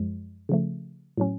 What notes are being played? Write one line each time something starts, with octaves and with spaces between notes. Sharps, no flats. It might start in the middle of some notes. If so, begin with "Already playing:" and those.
Already playing: F#2 F3 G#3
C#3 F3 A3
A2 F#3 C#4